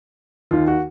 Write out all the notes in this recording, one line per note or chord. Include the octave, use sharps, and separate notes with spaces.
D#2 D#3 F4
F#4